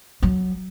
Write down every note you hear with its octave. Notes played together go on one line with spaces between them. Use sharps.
F#3